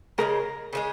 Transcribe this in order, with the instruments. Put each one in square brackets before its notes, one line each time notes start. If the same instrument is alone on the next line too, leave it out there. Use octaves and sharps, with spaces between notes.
[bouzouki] C#3 F3 G#3 [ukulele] A#4
[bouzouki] C#3 F3 G#3